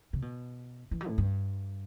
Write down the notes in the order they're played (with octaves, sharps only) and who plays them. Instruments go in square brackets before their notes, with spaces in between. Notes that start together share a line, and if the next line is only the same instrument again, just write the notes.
[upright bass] C3
B2
E3
F#3
A2
G2